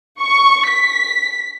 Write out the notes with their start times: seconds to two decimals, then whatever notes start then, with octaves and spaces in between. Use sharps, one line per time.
0.20 C#6
0.69 B6